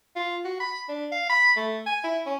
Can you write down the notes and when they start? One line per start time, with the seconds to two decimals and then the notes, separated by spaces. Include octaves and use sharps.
0.16 F4
0.45 F#4
0.60 B5
0.89 D4
1.12 F5
1.29 B5
1.57 A3
1.86 G#5
2.04 E4
2.26 C#4